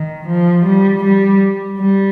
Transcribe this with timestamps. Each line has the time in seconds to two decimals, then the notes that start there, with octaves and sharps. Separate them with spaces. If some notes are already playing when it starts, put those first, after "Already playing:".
Already playing: D#3
0.28 F3
0.66 G3
1.05 G3
1.80 G3